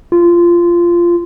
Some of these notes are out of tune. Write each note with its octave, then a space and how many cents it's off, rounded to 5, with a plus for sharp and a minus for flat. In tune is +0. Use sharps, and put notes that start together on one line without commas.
F4 -15